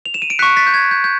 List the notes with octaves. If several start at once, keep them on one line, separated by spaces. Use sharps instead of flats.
F7
E7
D#7
D7
C#6 F#6 B6 C#7
A6 B6
G6
G#6
G6
G6